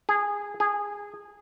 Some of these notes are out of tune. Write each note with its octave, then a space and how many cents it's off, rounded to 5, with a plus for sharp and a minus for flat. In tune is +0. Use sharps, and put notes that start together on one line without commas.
G#4 -15
G#4 -15